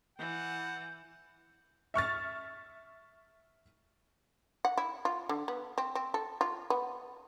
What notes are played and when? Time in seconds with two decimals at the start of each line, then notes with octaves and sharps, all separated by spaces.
0.18 E3 F#5 G6
1.94 E5 C#6 F6 A6
4.65 F#5
4.77 E4
5.05 F4
5.29 D3
5.48 B3
5.78 C4
5.95 C4
6.14 A4
6.41 F4
6.70 B3